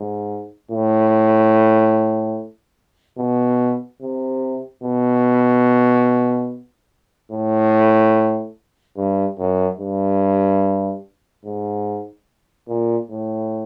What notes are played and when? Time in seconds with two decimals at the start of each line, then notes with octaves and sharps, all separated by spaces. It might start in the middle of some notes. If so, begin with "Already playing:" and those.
Already playing: G#2
0.71 A2
3.18 B2
4.01 C3
4.83 B2
7.32 A2
8.97 G2
9.39 F#2
9.79 G2
11.45 G#2
12.68 A#2
13.11 A2